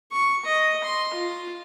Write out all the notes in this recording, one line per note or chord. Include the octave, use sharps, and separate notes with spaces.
C#6
D#5
C6
F4